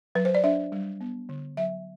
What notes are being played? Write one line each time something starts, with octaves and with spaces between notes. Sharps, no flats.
F#3 B4
C5
D5
D4 E5
G3
B3
D3
F#3 E5